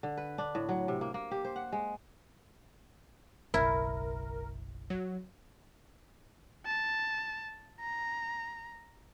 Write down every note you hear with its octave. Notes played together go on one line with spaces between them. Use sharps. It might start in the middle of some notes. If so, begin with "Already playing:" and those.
D3
B4
D4
A2
F#3
C3
A#3
A#3
G4
C5
F#5
G#3
F#1 B1 E4 A#4
F#3
A5
A#5